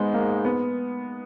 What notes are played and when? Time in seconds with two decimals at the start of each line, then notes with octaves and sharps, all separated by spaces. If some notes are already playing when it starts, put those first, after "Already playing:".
Already playing: G#2 G#3 B3 D#4
0.14 A#3
0.45 B3